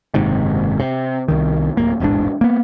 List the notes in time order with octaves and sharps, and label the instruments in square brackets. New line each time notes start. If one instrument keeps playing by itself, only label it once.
[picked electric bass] F#1 G#2 C3 D#3
C3
C2 D#3
D1 D#2 A#3
E1 A1 G#2 D4
A#3 B3